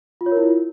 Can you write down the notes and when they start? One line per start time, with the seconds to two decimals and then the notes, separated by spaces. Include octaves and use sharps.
0.21 F4
0.26 C#5
0.32 A#4
0.37 E4
0.42 F4